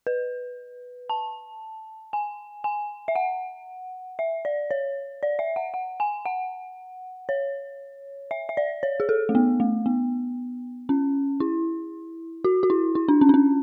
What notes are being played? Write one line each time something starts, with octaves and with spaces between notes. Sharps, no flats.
B4
A5
G#5
G#5
E5
F#5
E5
D5
C#5
D5
E5
F#5
F#5
G#5
F#5
C#5
E5
E5
D5
C#5
G#4
A4
A3
B3
A3
B3
C#4
E4
F#4
F#4
E4
E4
D4
C#4
D4
C#4